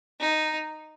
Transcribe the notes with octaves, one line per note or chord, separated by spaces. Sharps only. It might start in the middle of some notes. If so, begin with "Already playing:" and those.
D#4